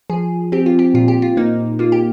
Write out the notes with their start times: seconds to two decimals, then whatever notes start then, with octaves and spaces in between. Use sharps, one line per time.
0.10 F3 G#4
0.52 C4 G4
0.66 F4
0.79 G4
0.94 A#2 F4
1.08 G4
1.22 F4
1.37 A#3 D#4
1.79 A#3 F4
1.92 G4